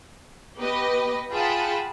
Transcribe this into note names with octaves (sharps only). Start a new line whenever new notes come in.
B3 G4 B4 D#5
F4 G#4 F#5 G5 A5 B5